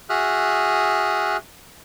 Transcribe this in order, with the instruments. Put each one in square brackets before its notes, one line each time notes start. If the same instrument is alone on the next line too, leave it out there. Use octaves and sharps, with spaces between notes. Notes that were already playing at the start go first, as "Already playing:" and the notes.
[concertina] F#4 G#4 E5 D#6 F6 F#6